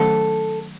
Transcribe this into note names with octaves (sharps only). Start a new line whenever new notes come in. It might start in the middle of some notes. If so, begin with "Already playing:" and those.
Already playing: D#3 F#3 A3 C#4 A4